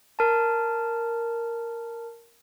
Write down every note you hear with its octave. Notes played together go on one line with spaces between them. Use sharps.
A#4 A5